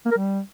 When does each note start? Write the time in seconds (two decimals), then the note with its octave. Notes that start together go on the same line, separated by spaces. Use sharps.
0.05 A#3
0.11 A#4
0.17 G3